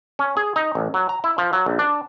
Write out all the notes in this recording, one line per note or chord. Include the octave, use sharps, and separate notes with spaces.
C#4
G#4
D#4
A1
F#3
A#5
E4
F3
F#3
A#1
D4